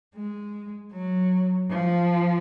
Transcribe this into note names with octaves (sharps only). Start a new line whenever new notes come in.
G#3
F#3
F3